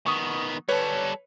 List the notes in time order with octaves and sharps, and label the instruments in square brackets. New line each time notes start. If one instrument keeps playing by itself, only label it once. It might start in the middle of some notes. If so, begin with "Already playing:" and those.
[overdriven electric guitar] D#3 B3 [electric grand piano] C#6 D#6
[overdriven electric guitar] G3 A4 [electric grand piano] B4 C#5